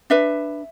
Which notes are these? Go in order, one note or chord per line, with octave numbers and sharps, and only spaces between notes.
D4 B4 E5